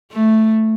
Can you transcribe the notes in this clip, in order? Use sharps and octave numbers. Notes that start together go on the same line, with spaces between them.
A3